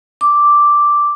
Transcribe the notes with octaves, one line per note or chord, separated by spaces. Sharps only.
D6